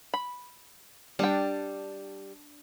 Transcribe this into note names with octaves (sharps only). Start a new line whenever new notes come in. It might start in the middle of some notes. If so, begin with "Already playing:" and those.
B5
G3 D4 G5